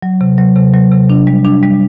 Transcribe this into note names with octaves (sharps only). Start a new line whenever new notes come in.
F#3
C3
F#3
C3
F#3
C3
D4
G3
D4
G3